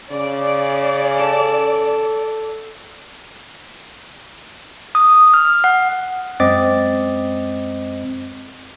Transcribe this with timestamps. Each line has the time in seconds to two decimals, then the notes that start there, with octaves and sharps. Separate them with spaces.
0.11 C#3 D5
1.19 A4
4.95 D#6
5.34 F6
5.64 F#5
6.40 F#2 G#3 C4 D#5 D6 A6